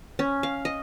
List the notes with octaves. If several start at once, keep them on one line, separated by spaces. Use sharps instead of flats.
C#4
F5
D#5